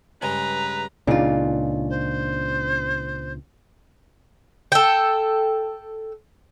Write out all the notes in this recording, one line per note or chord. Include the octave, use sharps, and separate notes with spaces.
G2 C#3 G#3 B4 A#5
C#2 A#2 C#3 D4 D#4 F4
C5
A4 G5